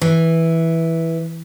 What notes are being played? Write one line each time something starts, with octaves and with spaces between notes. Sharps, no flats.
E3